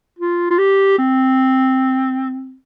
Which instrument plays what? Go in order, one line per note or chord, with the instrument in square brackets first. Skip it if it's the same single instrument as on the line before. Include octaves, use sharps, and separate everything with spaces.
[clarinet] F4
F4
G4
C4